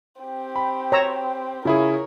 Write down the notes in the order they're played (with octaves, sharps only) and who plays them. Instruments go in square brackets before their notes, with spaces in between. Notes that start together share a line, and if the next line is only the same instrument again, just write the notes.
[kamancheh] C4 G4
[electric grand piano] B5
[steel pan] C#5 A#5 E6
[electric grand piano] C#3 E4 G#4 [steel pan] F4 [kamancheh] A#4 C#5